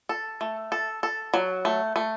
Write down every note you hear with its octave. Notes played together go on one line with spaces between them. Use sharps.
A4
A3
A4
A4
F#3
A3
A3